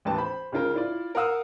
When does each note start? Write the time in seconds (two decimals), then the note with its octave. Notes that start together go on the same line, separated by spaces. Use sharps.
0.05 A1 D#2 A2 B4 A5
0.17 C5 B5
0.52 C#2 C#3 F4 A#4
0.74 E4 F4 D5
1.15 A#4 F5 F#5 D#6 E6